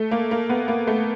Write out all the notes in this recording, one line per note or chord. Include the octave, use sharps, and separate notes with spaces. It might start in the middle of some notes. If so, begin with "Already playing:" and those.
Already playing: A3
A#3
A#3
B3
A#3
A3